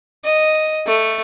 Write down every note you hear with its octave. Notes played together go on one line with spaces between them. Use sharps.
D#5
A3